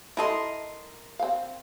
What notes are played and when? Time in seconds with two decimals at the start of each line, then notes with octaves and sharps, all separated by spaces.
0.17 E4 A4 A#4 D#5 C6
1.19 C4 F5